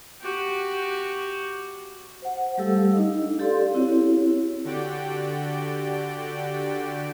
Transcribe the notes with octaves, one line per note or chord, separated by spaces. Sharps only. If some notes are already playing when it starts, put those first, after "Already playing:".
F#4 G4
C5 F#5
G3 A3 G4 A4 F5 E6
D4 D#4 D#5
G4 A4 D5 F5 C6
C4 E4 F#4 G4 C#5
D3 F#4 G4 D5 G5